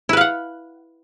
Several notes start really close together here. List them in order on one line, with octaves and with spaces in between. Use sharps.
E4 B4 F5 F#5